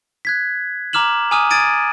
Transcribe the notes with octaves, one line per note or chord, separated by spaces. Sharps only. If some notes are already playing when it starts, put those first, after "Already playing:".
F#6 G#6 B6
A#5 D6 F6 E7 F#7
G#5 A#5 D6 D#6 F6 D#7
D#6 G#6 A6 D7 D#7